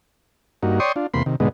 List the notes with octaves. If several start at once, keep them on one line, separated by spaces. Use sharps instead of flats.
G2 A#3 D#4 F#4
C#5 D5 G5 C6 C#6 D#6
D4 F4
E2 C3 A#3 B5 C6
C3 D#3
G#2 B2 D3 G#3 B3 D#4